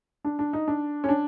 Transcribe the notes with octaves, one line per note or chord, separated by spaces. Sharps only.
D4
D4
D#4
D4
C#4
D4